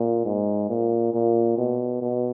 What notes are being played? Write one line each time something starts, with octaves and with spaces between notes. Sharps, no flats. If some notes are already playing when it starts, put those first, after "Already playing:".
Already playing: A#2
G#2
A#2
A#2
B2
B2